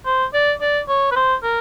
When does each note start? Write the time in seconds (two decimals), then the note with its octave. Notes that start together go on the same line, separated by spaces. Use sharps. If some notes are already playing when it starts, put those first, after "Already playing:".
0.06 C5
0.33 D5
0.61 D5
0.88 C#5
1.12 B4
1.16 C5
1.43 A#4